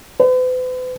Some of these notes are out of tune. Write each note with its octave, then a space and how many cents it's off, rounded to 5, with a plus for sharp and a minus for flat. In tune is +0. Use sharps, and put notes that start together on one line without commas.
B4 +45